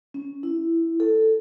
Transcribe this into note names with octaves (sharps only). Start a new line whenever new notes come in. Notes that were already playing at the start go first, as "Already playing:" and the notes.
C#4
E4
A4